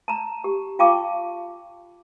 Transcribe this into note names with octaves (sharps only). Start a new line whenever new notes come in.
A5 A#5
G4
F4 F5 G5 A5 C#6 D6